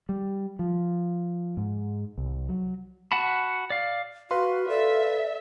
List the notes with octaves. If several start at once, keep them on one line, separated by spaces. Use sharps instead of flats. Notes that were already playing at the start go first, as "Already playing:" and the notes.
G3
F3
G#2
C2
F#3
F#4 F#5 A5 B5
D5 F5
F#4 B4 F5 C6
A4 D5 E5